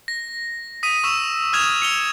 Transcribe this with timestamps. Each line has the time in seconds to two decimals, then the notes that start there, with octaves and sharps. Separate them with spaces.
0.08 A#6
0.83 D#6 B6 D#7
1.04 C#6 E6 B6 E7
1.53 D#6 F6 G#6 E7 F7
1.82 C#7 F7 G7